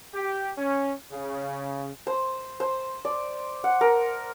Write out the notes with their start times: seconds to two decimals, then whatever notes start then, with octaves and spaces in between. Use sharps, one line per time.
0.14 G4
0.58 C#4
1.11 C#3
2.07 C5
2.60 C5
3.05 D5
3.64 F#5
3.81 A#4